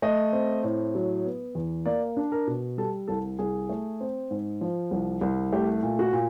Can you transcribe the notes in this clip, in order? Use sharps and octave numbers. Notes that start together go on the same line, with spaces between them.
A3 D#5
C4
A2
F#3
B3
E2
A#3 D5
D4
A#4
B2
G3 A4
C2 A4
C2 G#4
A3
C4
G#2
F3
C2
C2
A3 G4
A#2
F#4
A#2